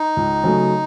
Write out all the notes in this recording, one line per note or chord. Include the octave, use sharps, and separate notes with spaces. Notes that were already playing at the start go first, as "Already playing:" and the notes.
Already playing: D#4
C#2
C#3 F#3 A3